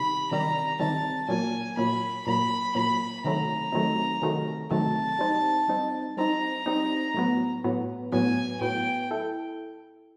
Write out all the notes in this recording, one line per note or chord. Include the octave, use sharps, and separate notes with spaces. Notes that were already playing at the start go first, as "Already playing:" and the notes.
Already playing: C3 D#3 G3 B5
C3 D#3 G3 A#5
C3 D#3 G3 A5
A#2 F#3 A#3 G#5
A#2 F#3 A#3 B5
A#2 F#3 A#3 B5
A#2 F#3 A#3 B5
C3 D#3 F#3 A3 A#5
C3 D#3 F#3 A3
C3 D#3 F#3 A3
C3 D#3 F#3 A3 A5
G3 C4 D#4
G3 C4 D#4
G3 C4 D#4 A#5
G3 C4 D#4
A2 F#3 B3
A2 F#3 B3
A2 F#3 B3 G#5
A2 F#3 B3 G5
E4 A4